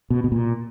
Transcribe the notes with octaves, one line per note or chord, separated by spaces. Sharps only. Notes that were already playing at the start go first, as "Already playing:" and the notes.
B2
B2
A#2